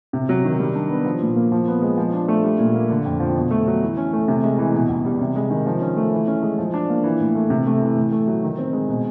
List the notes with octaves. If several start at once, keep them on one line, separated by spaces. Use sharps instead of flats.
C3
F#3
D#3
G3
D4
B3
F3
A#2
A#3
F3
B3
G#3
F3
D4
A3
G3
A#2
A#3
D3
F2
F3
B2
A3
F#3
E3
C#4
A3
C3
G#3
E3
B2
C#2
G3
C3
G#3
D#3
F3
C#4
A3
E3
C#4
G#3
F3
D4
A#3
E3
A2
A3
C3
A3
E3
A2
A3
F#3
D#3
C4
G#3
B2